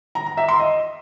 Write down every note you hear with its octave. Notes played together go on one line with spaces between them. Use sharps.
A#5
A#5
E5
C6
D#5